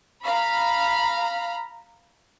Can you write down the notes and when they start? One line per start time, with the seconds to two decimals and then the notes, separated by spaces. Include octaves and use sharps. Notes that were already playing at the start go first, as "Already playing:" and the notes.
0.22 F5 A#5 B5